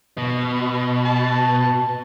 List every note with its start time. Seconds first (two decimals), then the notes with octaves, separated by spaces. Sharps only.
0.17 B2
1.05 A5